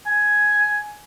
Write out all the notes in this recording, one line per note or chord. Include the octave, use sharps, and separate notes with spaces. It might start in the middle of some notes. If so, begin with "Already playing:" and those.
G#5